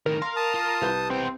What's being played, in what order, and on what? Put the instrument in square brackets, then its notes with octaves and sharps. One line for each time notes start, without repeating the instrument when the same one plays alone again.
[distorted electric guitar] A2 D#3 [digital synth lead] A#4
[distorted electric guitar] F5 [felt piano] C6
[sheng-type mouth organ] A5 D#6
[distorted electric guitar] F4
[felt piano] C2 B4 G6
[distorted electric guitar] B3 G5 [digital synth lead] C4